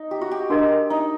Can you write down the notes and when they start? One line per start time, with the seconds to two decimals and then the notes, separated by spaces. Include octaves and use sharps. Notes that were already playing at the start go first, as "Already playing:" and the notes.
Already playing: D#4
0.11 G4
0.21 F#4
0.31 G4
0.50 D4 F#4 A#4 D#5
0.90 D#4